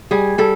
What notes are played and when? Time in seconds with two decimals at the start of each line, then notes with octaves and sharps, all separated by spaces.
0.11 G3 G#4
0.38 G3 A4